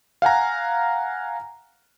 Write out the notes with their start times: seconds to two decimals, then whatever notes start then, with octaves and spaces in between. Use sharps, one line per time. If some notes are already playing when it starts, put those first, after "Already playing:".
0.22 F5 F#5 G#5 A#5